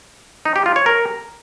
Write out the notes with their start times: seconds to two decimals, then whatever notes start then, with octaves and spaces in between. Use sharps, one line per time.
0.45 D#4
0.56 G4
0.66 F4
0.76 C#5
0.86 A#4